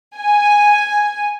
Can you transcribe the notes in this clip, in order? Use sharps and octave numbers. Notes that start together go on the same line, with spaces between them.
G#5